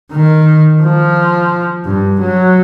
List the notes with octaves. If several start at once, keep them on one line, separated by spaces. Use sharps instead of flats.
D#3
F3
G2
F#3